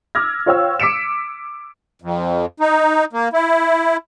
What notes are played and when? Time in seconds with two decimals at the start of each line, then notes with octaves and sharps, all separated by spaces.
0.15 D6 E6 F6 G#6 A#6
0.46 F4 C5 C#5 F5 G5 E6
0.80 D6 B6 C#7 D7 E7
2.02 F2
2.60 D#4
3.13 A#3
3.33 E4